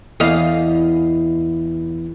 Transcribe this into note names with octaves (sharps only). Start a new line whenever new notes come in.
E2 D#5 F5